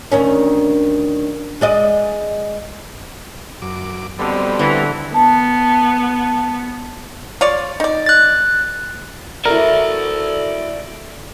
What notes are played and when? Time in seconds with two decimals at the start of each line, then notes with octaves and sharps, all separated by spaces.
0.12 D2 D#3 C#4
1.61 G#3 D5 D#5
3.62 F#2 D6
4.19 F2 B2 D3 G3 B3 C4
4.59 D3 E3
5.14 B3 A5
7.41 F4 C#5 D5
7.80 D#4 D5
8.06 F#6 A6
9.46 E4 F#4 A4 A#4 D5 E5